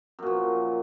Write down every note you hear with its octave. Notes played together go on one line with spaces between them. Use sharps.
F#2 A#2 F3